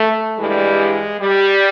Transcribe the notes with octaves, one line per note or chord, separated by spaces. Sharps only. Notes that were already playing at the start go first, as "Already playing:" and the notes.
Already playing: A3
G2 E3 G3 G#3
G3